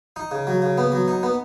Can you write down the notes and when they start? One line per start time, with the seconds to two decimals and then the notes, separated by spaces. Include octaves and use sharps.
0.16 D#4
0.31 C#3
0.47 F#3
0.62 C#3
0.78 B3
0.92 F#3
1.08 D#4
1.23 B3